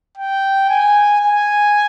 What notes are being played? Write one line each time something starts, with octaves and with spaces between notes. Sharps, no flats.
G5
G#5
G#5